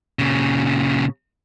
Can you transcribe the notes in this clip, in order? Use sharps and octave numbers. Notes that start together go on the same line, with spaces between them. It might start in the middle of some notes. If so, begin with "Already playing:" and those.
A#2 C#3